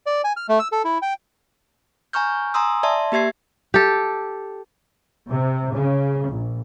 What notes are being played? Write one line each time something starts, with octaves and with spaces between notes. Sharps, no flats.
D5
G#5
F6
A3
E6
A4
E4
G5
G#5 A#5 C#6 F6 G6
G#5 A#5 C6 D#6 E6
D5 E5 A5 C6
A#3 G4 E5 G#6 C7
G4 A4
C3
C#3
A#1